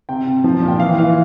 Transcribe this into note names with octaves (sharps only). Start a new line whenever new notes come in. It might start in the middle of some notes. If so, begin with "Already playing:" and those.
C3 G5
C3
F3
A#2
G5
E3 F5
E3 F5